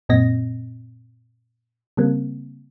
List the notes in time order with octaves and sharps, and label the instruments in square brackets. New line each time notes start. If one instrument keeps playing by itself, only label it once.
[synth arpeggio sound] F#2 A#2 C4 D#5 A#6
C#3 G3 A#3 C4